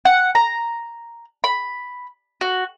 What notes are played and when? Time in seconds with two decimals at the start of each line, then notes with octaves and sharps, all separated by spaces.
0.05 F#5
0.35 A#5
1.44 B5
2.41 F#4